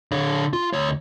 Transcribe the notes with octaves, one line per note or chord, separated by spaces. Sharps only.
D3 C#5
F4
D2 C#5